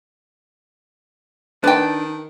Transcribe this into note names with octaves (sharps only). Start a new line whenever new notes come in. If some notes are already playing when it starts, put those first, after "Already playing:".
D#3 D4 B4 G5